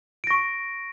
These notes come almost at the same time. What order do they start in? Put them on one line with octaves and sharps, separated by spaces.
D7 A#6 C#6